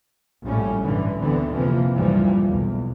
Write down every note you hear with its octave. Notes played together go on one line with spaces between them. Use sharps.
A#1 A2 G3 A3 C#4
G2 D3 E3
D2 D3 E3 B3 C4
F2 C3 E3 F3 A#3
F#1 D2 A#2 E3 F3 G3
B1 E2